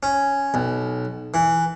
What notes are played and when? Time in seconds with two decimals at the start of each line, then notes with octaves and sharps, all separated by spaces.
0.03 C#4
0.54 B1
1.34 E3